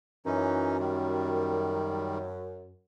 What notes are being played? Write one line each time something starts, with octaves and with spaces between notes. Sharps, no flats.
F#2 E3 C#4 D#4
D#3 G3